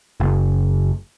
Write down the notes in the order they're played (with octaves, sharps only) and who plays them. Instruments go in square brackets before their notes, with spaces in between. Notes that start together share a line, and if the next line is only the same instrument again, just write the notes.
[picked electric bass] F#1